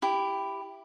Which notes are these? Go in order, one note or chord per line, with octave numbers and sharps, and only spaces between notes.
E4 G4